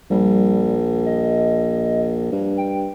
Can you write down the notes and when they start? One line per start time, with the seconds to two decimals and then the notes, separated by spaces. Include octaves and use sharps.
0.10 A#1 G3
1.06 D#5
2.32 G2
2.58 G5